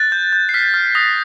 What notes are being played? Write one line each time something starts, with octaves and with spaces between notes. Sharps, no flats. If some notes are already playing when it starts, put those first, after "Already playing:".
Already playing: F#6 A6
G6
G6
C7
F6 B6
F6
D#6 A#6